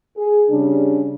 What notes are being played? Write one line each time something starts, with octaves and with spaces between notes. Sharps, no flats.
G#4
C#3 G3 D4